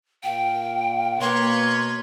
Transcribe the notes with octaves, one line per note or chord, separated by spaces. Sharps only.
A#2 F5 G5
B2 A#3 B4 C#5 C6